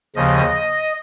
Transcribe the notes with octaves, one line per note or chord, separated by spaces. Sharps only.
D#2 C#3 F3 D#5